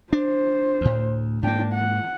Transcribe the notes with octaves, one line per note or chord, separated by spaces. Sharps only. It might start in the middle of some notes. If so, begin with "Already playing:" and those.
D4 C5
D2 A2
G#2 A#3 D4 G5
F#5